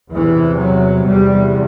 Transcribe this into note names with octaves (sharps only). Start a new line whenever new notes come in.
E2 C3 E3
F#3
E2 C3 G3